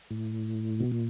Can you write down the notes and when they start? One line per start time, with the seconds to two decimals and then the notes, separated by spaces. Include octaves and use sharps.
0.11 A2
0.80 B2
0.92 A#2